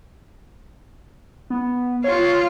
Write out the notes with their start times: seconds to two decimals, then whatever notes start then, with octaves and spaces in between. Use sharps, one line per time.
1.50 B3
2.04 F4 C#5